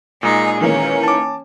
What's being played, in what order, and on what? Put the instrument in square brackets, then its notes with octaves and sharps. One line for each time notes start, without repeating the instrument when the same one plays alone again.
[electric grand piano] A#2 G#3 [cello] D#4 G#4
[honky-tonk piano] D#3 E3 A#3 [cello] C#4
[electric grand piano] A5 D6